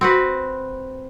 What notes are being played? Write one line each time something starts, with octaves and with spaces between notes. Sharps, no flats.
C4 F#4 B4